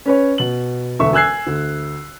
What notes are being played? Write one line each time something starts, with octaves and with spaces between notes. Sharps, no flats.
C#4 B4 C#5
B2 F#7
E1 D2 E5 C#6
G#5 E6 F#6 G#6 C7
D2